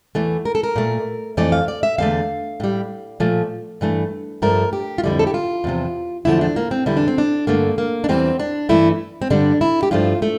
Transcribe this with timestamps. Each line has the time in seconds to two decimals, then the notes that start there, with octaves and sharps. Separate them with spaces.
0.15 E2 E3 A3
0.45 A#4
0.55 A4
0.63 A#4
0.76 A#2 A3
1.37 F2 E3 A3 D5
1.52 F5
1.68 D5
1.83 E5
1.98 E2 D3 A3 F5
2.60 A2 G3
3.20 A#2 F3 A3
3.81 G2 E3 A3
4.42 G2 F3 A3 A#4
4.73 G4
4.98 F4
5.04 F2 D3 G3 E4
5.19 A4
5.27 G4
5.34 F4
5.64 E2 C3 F3
6.25 E2 D3 F3 A3 E4
6.41 D4
6.56 A#3
6.71 C4
6.86 E2 D3 G3 E4
6.97 D4
7.08 C4
7.18 D4
7.47 G2 D3 A3 A#3
7.78 A#3
8.04 D4
8.09 E2 E3 G3 C4
8.39 D4
8.69 G2 E3 A3 E4
9.22 C4
9.30 G2 D3 G3 D4
9.61 E4
9.83 G4
9.91 G2 F3 A3 F4
10.22 A3